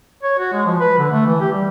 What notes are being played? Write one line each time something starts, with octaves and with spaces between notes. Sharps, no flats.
C#5
F#4
G#3
F3
B4
D3
A3
E3
G4
G3